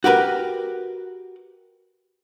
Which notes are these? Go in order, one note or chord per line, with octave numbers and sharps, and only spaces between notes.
F#4 G4 A#4 B4